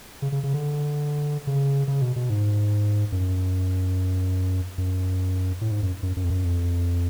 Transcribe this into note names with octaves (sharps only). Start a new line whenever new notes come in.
C#3
C#3
C#3
D3
C#3
C#3
B2
B2
G#2
F#2
F#2
A2
G#2
F#2
F#2
F#2
F2
F#2
F2